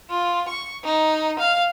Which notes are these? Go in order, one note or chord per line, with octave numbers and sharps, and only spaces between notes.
F4
C#6
D#4
F5